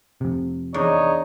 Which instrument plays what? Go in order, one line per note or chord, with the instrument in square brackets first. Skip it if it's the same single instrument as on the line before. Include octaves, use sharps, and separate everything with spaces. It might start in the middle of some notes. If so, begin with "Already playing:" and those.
[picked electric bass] F2 C3
[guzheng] E2 D4 [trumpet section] D#4 C#5 D#5